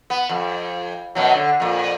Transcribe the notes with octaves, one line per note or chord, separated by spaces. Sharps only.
B3
F2
F#2 B2 F#3
D3
F2 A#2